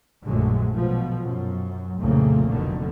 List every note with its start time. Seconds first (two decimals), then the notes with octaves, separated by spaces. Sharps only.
0.24 A#1 F#2 D3 F#3 G#3 A3
0.74 B2 F3
1.24 F#2
1.98 C2 F2 A#2 C#3 A3 A#3
2.48 F1 F#2 B2 D3 D#3